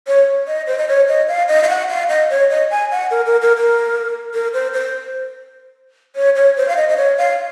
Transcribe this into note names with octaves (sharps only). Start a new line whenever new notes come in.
C#5
D#5
C5
D#5
C#5
D#5
F5
D#5
F5
F#5
F5
D#5
C#5
D#5
G#5
F#5
A#4
A#4
A#4
A#4
A#4
C5
C5
C#5
C#5
C5
F5
D#5
D#5
C#5
F5